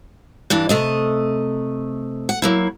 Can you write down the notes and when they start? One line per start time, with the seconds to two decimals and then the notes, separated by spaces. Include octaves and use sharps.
0.50 G2 E3 D4
0.69 C3 A3 D#5
2.29 F#5
2.42 F#3 A#3 E4